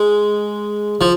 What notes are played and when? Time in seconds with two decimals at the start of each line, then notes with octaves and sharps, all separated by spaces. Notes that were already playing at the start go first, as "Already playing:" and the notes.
Already playing: G#3
1.01 F3